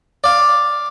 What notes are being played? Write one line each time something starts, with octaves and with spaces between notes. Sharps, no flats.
D5 F5